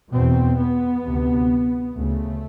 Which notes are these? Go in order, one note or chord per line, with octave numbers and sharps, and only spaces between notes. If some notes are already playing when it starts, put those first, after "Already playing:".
E2 B2 C4
B3
D2 C3
D2 C#3 A3